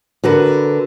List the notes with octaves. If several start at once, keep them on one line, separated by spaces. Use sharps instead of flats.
D3 F#4 A#4 B4